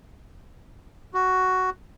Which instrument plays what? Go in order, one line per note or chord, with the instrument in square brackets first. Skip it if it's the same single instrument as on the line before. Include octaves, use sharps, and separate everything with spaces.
[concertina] F#4